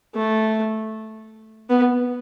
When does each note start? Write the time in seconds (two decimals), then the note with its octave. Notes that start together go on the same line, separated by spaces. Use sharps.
0.15 A3
1.69 B3